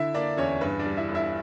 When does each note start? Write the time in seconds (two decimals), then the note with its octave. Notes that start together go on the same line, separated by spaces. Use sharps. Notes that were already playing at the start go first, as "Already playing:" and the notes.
Already playing: D3 E4 E5
0.14 A#3 D4 D5
0.37 E2 C#4 C#5
0.61 G2 B4
0.79 D4 D5
0.86 G3
0.97 E4 E5
1.08 G1
1.15 E4 E5